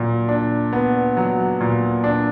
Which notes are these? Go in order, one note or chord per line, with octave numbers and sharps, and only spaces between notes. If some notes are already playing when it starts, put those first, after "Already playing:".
Already playing: A#2 F#3
D4
B3
F#3
A#2
D4